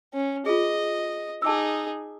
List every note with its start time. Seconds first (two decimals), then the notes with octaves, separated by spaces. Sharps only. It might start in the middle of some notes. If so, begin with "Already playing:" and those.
0.14 C#4
0.46 F4 G#4 D#5
1.42 D#4 G#4 A5 D6 E6